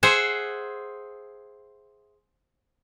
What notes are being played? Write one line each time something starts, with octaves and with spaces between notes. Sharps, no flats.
G#4 C5 E5 F#5